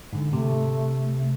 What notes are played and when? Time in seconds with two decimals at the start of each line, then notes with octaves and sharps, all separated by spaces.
0.13 G#2 D3
0.33 C3 A3